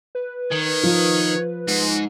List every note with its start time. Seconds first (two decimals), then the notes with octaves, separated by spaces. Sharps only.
0.15 B4
0.52 D#3 C#5
0.83 F3
1.68 G#2 F#4